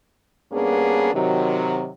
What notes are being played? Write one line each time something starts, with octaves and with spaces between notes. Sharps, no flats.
G2 A#3 B3 C#4 D4 G#4
C3 D#3 F#3